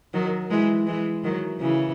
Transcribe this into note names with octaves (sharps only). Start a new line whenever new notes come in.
D#3 F#3
E3 G#3
E3 G#3
D#3 F#3
C#3 E3